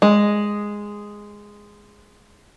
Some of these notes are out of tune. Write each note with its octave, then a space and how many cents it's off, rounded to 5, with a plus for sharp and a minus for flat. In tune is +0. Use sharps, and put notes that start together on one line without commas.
G#3 -5